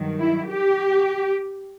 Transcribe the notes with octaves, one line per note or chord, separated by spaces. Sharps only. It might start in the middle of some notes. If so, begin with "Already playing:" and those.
Already playing: G2 D#3 F#3
E4
G4